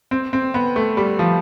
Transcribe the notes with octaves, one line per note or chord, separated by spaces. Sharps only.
C4
C4
B3
A3
G3
F3